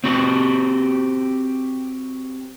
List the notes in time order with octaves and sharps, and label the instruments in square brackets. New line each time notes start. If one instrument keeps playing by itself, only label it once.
[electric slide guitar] C4 F#4 G4